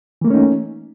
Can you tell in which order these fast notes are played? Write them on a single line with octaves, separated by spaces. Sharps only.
E3 A#3 A3 C#4 D#4